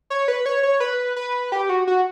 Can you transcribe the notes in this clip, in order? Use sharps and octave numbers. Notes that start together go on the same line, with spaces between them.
C#5
B4
C#5
C#5
B4
B4
G4
F#4
F#4